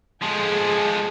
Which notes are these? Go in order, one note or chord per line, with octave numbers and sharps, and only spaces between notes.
F3 G#3 G#4 A4